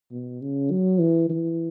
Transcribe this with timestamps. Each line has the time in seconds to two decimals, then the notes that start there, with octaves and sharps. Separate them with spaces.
0.12 B2
0.41 C#3
0.71 F#3
1.00 E3
1.30 E3